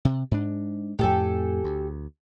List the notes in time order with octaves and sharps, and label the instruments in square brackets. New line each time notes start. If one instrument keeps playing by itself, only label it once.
[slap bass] C3
G#2 D4
[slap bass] F2 A2 [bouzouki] G4 A4 G#5
[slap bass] D2